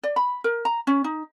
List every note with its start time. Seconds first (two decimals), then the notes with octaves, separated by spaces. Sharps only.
0.03 D5
0.16 B5
0.44 A#4
0.65 A#5
0.87 C#4
1.04 D#4